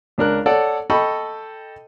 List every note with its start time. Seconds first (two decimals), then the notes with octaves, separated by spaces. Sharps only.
0.18 C#2 D4 A#4 F#6
0.46 A4 C#5 D5 F#5
0.90 A4 D#5 G5 B5 C#6